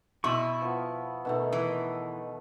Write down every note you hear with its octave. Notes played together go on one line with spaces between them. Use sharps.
B2 E4 C#6 E6
F3 B3
B2 D#3 A3
E3